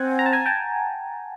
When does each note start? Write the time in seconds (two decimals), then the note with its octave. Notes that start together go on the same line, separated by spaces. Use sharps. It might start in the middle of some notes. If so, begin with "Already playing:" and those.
Already playing: C4 F#5 G#5
0.19 A#5
0.26 A5
0.33 G#5 A#5
0.46 G5 A5